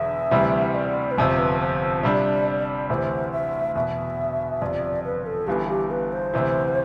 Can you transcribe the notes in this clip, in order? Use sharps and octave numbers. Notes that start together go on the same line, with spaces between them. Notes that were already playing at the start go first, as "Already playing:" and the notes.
Already playing: E1 E2 D3 E5
D2 C3 E3 G3
D5
B4
G1 F2 C3 C5
B4
C5
C3 G3 D4 D5
D2 C3 E3 C5
E5
E2 B2 B3 E5
G1 F2 C3 D5
B4
A4
G1 G2 E3 B3 G4
G4
B4
C5
D2 C3 E3